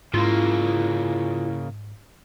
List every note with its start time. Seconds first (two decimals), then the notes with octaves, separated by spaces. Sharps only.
0.14 G#2 C#3 A#3 E4 F4